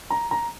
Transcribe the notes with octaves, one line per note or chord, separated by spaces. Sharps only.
A#5
A#5